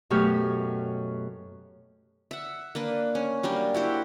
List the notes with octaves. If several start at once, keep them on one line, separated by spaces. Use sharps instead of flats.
F#2 B2 A3 G4 C#5 F6
E5 F#5
A#3 D4 B4
C#4
F#3 G3 A#3 D4
E4 F#4 G4 C5